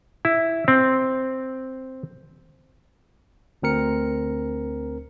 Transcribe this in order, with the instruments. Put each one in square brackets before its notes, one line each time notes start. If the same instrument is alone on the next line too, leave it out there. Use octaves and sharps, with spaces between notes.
[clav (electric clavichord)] E4
C4
[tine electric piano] D2 C4 A#4 C#7